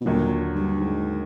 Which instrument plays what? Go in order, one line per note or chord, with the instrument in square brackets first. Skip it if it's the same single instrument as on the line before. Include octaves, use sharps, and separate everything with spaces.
[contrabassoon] B2
[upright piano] D#2 D3 F#3 [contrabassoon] A#2
[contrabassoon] G2
G#2